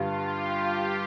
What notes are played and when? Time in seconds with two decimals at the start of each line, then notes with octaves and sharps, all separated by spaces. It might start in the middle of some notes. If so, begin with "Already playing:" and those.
Already playing: G2 D3 G3 F4
0.17 G4